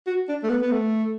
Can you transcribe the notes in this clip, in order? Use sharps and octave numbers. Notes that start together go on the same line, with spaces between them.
F#4
D4
A3
B3
B3
A3